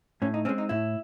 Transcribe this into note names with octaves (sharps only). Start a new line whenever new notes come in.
A2 C#4
D#4
G#3 C4 C#4
D#4
A2 E4